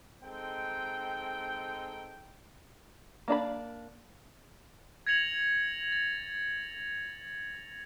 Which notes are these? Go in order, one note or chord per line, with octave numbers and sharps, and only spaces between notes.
G#3 C4 D#4 A4 G5
A#3 D4 F5 B5
G#6 A#6 C#7 F7 F#7
A6